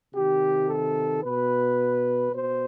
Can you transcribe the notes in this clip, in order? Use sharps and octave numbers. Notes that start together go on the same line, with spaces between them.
C3 D#3 G4
A4
B2 B4
B2 C5